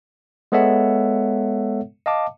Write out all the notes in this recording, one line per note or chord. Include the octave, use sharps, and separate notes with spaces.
G#3 B3 A4 C#5 E5 F#5
D#5 F5 A5 D6